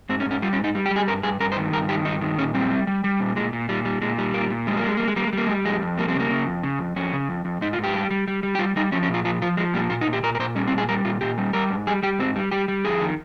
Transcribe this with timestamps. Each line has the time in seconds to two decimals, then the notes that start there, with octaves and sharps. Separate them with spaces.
0.09 G#2 C4
0.20 C#4
0.26 G#2
0.31 C#4
0.42 G3 F4
0.53 C#4
0.59 G#2 D#4
0.75 G3
0.86 G4
0.91 G3
0.96 G#4
1.08 G2 A#4
1.23 G2 G#4
1.40 G2 A#4
1.52 C5
1.57 D#3
1.72 G2 A#4
1.89 D#3 G4
2.05 G2 D#4
2.21 D#3
2.38 A#2 C#4
2.54 G3 C4
2.70 G3
2.87 G3
3.04 G3
3.20 A#2
3.36 A#2 G#3
3.53 A#2
3.69 A#2 G3
3.85 G3
4.01 A#2 G#3
4.18 G3
4.34 A#2 A#3
4.50 A#2
4.67 G3 G#3
4.77 A#3
4.83 G3 G#3
4.97 G3 A#3
5.08 G#3
5.16 G3 A#3
5.27 G#3
5.33 G3 A#3
5.47 G3 G#3
5.65 F2 G#3
5.82 F2
5.97 G3 A#3
6.08 C4
6.15 C#3 A#3
6.30 C#3
6.47 F2
6.63 C#3
6.79 F2
6.96 F2 C#4
7.13 C#3
7.29 F2
7.45 F2
7.61 G#2 D#4
7.73 F4
7.78 G#2 G4
7.94 G3
8.11 G3
8.28 G3
8.43 G3
8.55 G4
8.59 G3 F4
8.76 G3 D#4
8.92 F3 C#4
9.03 C#4
9.09 A#2
9.14 F4
9.25 F3 F4
9.42 F3 F4
9.57 F3 G#3
9.74 A#2 G3
9.90 A#2 F4
10.01 D#4
10.07 A#2
10.13 G4
10.23 A#2 A#4
10.35 A#4
10.39 A#2 C5
10.55 G3 C#4
10.67 C4
10.72 A#2
10.78 G#4
10.89 G3 A#4
11.05 A#2 F4
11.21 A#2 G4
11.38 G3
11.53 G3 A#4
11.70 G#2
11.87 G3 G#4
12.03 G3 G4
12.19 G#2 C4
12.36 G3
12.51 G3 G4
12.68 G3
12.85 F2 G#4
13.01 D#3